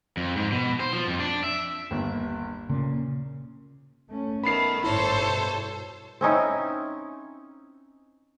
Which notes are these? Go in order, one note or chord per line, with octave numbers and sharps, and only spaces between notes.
F2
G#2
B2
C5
F3
F2
D4
E5
G1 D#2
A#2 C#3
A3 C#4
D#3 A3 B3 B5 C7
G1 A2 E4 A4 C5 C#5
G2 B2
C4 C#4 D#4 E4